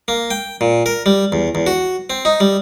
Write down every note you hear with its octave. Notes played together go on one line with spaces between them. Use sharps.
A#3
G5
A#2
A#4
G3
E2
E2
F#4
C4
D#4
G3